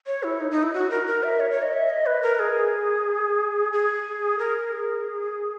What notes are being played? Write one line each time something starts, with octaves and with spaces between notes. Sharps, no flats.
C#5
E4
D#4
D#4
E4
F#4
A#4
A#4
E5
C#5
C#5
D#5
E5
D#5
B4
A#4
G#4
G#4
A#4
G#4